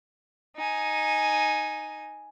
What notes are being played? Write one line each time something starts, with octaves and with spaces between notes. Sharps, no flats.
D#4 G#5